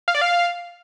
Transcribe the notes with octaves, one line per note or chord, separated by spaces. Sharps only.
F5
D5
F5